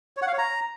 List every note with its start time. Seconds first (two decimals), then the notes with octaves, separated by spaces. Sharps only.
0.17 C#5
0.22 F#5
0.28 F5
0.33 C#5
0.38 A#5